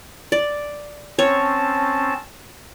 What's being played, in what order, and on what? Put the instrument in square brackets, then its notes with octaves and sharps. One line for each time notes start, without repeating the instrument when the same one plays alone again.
[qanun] D5
[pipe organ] C4 C#4 A5 [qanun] C#5